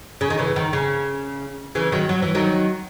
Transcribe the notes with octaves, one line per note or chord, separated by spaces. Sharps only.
C#3
D#3
C#3 E3
D#3
C#3
C#3 E3
D#3 F#3
F#3
E3
D#3 F#3